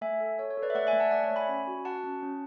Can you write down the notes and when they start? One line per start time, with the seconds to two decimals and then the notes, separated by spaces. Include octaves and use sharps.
0.01 A3 E5 G#5
0.20 A4
0.38 A4 C#5
0.50 C#5
0.57 A4
0.62 B4 D5
0.70 E5
0.75 A3 D5 F#5
0.87 E5 G#5
0.93 A3
1.00 F#5 A5
1.11 A3 D5 F#5
1.24 C#5 E5
1.31 A3
1.36 G#5 B5
1.49 C#4
1.68 F#4
1.85 F#4 F#5 A5
2.04 C#4
2.22 C#4